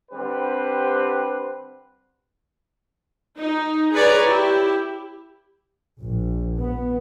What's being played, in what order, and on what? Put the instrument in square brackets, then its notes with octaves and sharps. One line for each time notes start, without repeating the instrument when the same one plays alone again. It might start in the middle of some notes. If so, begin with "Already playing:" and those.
[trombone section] D3 G3 C4 G4 B4 C5
[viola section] D#4
G#4 B4 C#5 D5 A#5
E4 G4
[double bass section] A#1
B3